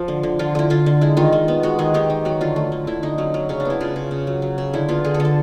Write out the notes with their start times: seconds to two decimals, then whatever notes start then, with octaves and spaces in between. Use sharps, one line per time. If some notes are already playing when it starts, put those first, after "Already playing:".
Already playing: F3
0.08 D3
0.23 D3
0.39 D3 F4
0.55 D3 E4
0.70 D3 F4
0.86 D3
1.01 G#3 E4
1.17 D#3 F4
1.32 D#3
1.48 B3
1.63 G#3 F#4
1.79 D#3 G#4
1.94 D#3 G4
2.10 D#3
2.25 F#3 F#4
2.41 D3 F4
2.56 A3
2.72 D3
2.87 D3 E4
3.03 D3 D#4
3.18 F#3 C#4
3.34 F#3
3.49 C#3 C#4
3.60 D4
3.65 B3 E4
3.81 C#3 F4
3.96 C#3
4.11 C#3
4.27 F#3
4.42 F#3
4.58 C#3
4.73 D3 E4
4.89 B3 F4
5.05 D3 G#4
5.14 A4
5.20 D3
5.25 A4